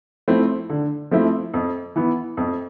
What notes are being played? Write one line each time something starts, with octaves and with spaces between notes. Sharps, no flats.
F3 A3 C4 E4
D3
F3 A3 C4 E4
F2
E3 B3
F2